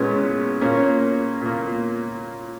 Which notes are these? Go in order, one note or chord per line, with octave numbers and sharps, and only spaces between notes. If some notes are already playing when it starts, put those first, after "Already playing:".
Already playing: A#2 G#3 B3 C#4
A#2 A#3 C#4
A#2 A#3